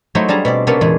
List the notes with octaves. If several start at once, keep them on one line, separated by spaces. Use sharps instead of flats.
F#3 A3 D#4 E4 C5
G3 D4 G#4 D#5 A5 A#5
B2 C4 D5
C3 A#3 B3 C#4 D4 A4
E2 A#2 G#3 G#4